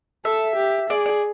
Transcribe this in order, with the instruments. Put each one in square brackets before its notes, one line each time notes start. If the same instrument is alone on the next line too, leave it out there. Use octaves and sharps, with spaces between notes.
[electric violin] A4 [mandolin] E5
[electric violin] G4
[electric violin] G#4 [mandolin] D5
[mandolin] D5